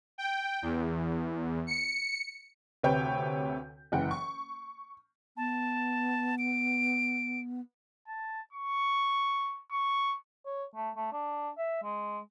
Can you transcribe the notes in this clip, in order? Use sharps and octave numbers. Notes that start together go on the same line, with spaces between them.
G5
E2
C#7
D2 C3 B4 C#5 G5 G6
F#1 E3 F#5 G5
C#6
B3 A5
D7
A5
C#6
C#6
C#5
A3
A3
D4
E5
G#3